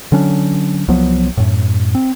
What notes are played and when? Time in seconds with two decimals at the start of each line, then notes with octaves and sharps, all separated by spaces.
0.12 D3 F#3 C#4 D4
0.88 C2 F3 F#3 B3
1.37 F#2 A2
1.95 C4